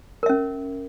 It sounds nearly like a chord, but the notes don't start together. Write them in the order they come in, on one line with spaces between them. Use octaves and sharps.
A#4 E5 C#4